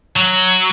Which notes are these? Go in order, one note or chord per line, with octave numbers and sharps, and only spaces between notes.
F#3